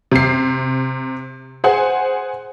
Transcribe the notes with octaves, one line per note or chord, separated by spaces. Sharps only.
C3 C7
G#4 C5 F#5 G#5